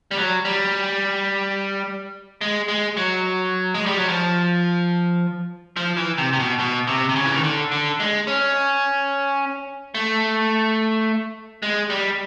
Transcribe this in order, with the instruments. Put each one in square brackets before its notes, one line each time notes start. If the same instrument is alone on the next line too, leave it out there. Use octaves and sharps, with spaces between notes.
[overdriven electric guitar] G3
F#3
G3
G#3
G#3
F#3
G#3
G3
F#3
F3
F3
E3
C3
C3
B2
B2
C3
C3
C#3
E3
D#3
D3
D3
G#3
C#4
A3
G#3
G3